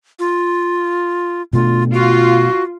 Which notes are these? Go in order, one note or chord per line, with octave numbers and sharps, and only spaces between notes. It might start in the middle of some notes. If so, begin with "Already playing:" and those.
F4
B2 A3 D4 F4
F4 F#4